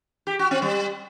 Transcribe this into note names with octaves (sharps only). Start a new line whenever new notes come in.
G4
F#4
C4
G3